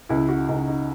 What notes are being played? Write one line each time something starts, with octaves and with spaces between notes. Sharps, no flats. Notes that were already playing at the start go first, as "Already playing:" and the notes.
C#2 E4
F#4
C#2 D#4
D#4